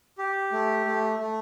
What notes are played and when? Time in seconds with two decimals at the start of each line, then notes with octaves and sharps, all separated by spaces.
0.18 G4
0.52 A3
0.86 A3
1.19 A3